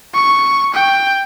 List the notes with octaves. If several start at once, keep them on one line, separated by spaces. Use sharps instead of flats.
C#6
G5